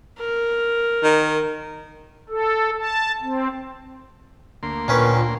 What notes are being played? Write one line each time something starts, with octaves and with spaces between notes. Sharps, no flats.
A#4
D#3
A4
A5
C4
D2 A#3 C6
A#2 D#3 C#4 B4